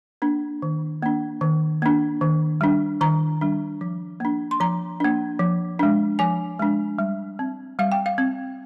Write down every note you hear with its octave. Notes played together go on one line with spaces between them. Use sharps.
A#3 D4
D#3
A#3 D4
D#3
A#3 D4
D#3
G3 D4
D#3 A#5
G3 D4
F3
A#3 D4
C6
F3 A#5
A#3 D4
F3
G#3 D4
F3 G#5
G#3 D4
G3
C4
G3 F5
G5
F5
C4